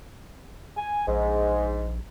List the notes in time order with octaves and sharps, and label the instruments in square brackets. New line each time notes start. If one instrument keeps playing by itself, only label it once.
[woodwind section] G#5
[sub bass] A#1 [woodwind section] G#2 [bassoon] G#3